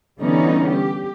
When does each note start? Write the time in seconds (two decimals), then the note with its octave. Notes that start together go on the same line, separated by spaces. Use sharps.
0.21 D3 E3 G3 B3 C#4 D#4
0.70 G4